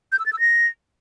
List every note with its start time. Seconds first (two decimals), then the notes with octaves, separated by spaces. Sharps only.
0.12 G6
0.19 E6
0.26 A6
0.33 E6
0.40 A#6